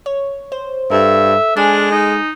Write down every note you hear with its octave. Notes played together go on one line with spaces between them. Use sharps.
C#5
C5
G2 A4 E5
G#3 D4 G#5
D#4